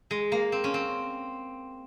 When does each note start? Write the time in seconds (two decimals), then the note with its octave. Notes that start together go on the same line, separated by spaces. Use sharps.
0.11 G#3
0.32 A#3
0.52 C4
0.64 C#4
0.74 C4